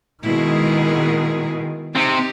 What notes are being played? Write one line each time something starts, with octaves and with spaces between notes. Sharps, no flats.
B2 D#3 G#3 E4 G#4
C3 C4 D#4 G4